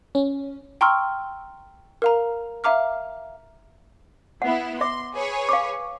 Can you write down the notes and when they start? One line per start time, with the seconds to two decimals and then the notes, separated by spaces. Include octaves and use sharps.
0.15 C#4
0.81 G5 A#5 C6 C#6 E6 F6
2.02 A#4 F5 A#5
2.64 E5 F5 A#5 D6 F6
4.42 B3 E4 F#5
4.81 E5 C6 D6
5.15 G#4 B4 C#5
5.49 F5 C#6 D6